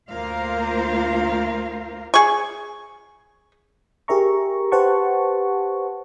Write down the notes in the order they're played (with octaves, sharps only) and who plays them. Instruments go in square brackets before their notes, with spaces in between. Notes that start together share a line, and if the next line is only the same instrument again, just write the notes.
[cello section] D2 A#3 F4 A#4 C5 F5
[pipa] G#4 C#6
[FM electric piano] G4 G#4 A#4 E5 A#5 C#6
G4 B4 C5 F#5 A5 C#6